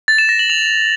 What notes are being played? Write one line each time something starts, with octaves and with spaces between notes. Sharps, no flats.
A6
E7
A#6
F#7
F7